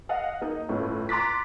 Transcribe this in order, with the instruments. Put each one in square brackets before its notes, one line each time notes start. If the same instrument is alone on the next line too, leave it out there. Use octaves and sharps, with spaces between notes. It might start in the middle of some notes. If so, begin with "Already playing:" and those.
[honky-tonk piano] D#5 F5 F#5
A#3 D#4
G1 A2 C#4
A#5 C6 D6 F#6 A6 B6